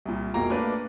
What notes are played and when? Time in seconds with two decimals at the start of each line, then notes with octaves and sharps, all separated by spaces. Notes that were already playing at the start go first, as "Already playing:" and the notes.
0.05 C2 A#2
0.34 F1 B2 G#3 A#3 A#5
0.50 A3 A#3 D4 B4